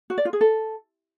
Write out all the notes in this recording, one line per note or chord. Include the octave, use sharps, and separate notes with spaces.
F#4
D5
F4
G#4
A4